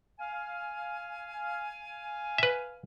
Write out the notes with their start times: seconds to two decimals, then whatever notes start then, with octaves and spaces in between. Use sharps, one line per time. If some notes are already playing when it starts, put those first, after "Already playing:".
0.19 F5 G#5
2.38 B4 E5